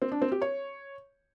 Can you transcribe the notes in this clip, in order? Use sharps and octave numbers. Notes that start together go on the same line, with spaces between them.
C4
D4
C4
G4
C#5